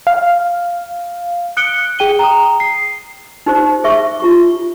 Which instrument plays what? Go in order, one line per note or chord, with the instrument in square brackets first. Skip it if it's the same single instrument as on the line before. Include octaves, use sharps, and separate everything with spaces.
[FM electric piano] F5
[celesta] D#6 F#6 C#7 D7 G7
G#4 G5 D#7 G7
A#5 D#6
C7
[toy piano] D#4 G4 C5
G#4 E5 C#6
F4 G4 C#6